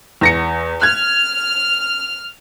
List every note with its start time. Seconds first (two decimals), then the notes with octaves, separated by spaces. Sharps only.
0.21 E2 A#6 C#7
0.81 F6 F#6 G#6